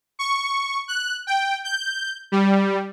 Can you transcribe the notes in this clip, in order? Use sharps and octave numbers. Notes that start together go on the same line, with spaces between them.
C#6
F#6
G5
G6
G3